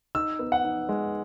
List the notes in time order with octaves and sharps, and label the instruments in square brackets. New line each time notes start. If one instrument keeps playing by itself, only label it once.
[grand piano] D#4 E6
B3
F#5
D#4
G#3